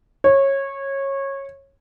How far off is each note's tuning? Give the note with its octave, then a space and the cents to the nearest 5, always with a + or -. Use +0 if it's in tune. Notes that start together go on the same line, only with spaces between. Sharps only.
C#5 -20